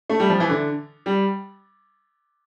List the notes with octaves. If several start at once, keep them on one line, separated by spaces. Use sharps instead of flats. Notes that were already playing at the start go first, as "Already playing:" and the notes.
A3
G3
F3
E3
D3
G3